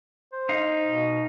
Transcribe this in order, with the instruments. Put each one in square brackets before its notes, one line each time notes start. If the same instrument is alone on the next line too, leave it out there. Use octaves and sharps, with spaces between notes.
[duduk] C5
[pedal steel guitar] D#4 F5
[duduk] B2